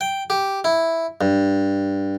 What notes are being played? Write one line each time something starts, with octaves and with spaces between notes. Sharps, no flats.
G5
G4
E4
G2